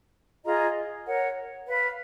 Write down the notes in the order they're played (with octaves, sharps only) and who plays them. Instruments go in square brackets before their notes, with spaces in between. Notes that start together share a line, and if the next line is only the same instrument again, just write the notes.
[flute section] F4 G#4 D#5 A#5
A#4 C#5 F#5
B4 F5 B5